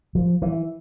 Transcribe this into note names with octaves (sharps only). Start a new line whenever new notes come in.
F3
E3